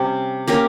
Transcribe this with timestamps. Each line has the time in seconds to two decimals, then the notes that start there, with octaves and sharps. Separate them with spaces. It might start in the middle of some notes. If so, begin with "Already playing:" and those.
Already playing: C3 G3 C#4
0.47 A#3 C#4 G4 A#4